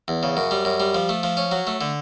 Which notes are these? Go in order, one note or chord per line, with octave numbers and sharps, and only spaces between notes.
E2
C#3
F#2
G3
F#2
G3
F3
A3
F3
C#4
F#3
A3
D3